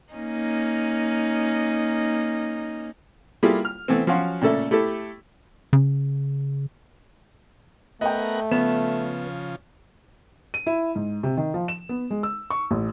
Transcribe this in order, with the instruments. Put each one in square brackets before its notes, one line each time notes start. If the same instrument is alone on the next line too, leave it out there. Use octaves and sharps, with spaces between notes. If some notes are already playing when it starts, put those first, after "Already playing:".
[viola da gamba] A#3 C#4 D#4
[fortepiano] G3 A#3 E4 F4 G#4 A4
F6
E3 A3 B3 C4
F3 F#3 C#4 F#4 F5 C6
A#2 C#3 A3 A4 E5
A3 E4 G4 A4
[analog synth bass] C#3
[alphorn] A3 [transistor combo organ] B3 A#4 F#5 [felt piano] D#5 G5
[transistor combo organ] C#3 F3 [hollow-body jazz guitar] B3 [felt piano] E7
[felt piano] D#7
E4
G#2
C3
D#3
F3
E7
B3
G#3
E6
C#6
A1